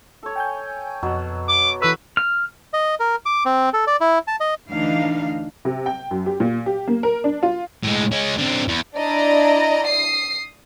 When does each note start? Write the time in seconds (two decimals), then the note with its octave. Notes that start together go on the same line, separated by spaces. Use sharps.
0.23 A4 C#5
0.36 G5 G#5 G6
1.03 F2 B2 F#3
1.48 D6
1.82 E3 A4 B4 C#6 E6
2.17 F6
2.73 D#5
3.00 A#4
3.26 D6
3.45 C4
3.73 A4
3.87 D5
4.01 E4
4.28 A5
4.40 D#5
4.70 D2 E3 D4 D#4 F5
5.65 C3
5.86 G5
6.11 F#2
6.26 G4
6.40 A#2
6.66 G4
6.88 A#3
7.03 A#4
7.24 D4
7.43 F4
7.84 A2 G#3
8.12 G#3 C#4
8.38 D3 C4
8.68 E2
8.96 D4 E4 D5 D#5 A#5
9.86 D#6 C7